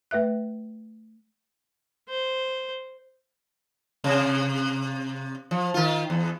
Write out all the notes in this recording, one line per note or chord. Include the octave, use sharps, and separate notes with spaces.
A3 B4 E5 F#6
C5
C3
F3
D#3 F4
E2